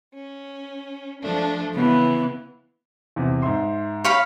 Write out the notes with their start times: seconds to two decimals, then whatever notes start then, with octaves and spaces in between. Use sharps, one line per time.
0.13 C#4
1.21 F3 A3 D4
1.75 C#3 E3 B3
3.16 E2 C3
3.42 G#2 E5 C6
4.04 C#5 F5 B5